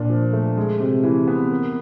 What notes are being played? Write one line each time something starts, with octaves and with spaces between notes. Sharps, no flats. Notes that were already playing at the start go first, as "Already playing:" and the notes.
Already playing: A#2 D4
F3
A3
G#3
C3
E3
B3
A#3